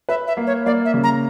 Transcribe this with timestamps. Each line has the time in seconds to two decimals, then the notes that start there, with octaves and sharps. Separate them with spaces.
0.09 B4 E5
0.27 E5
0.37 A#3
0.47 C#5
0.66 A#3 D5
0.85 E5
0.94 C#3
1.03 A#5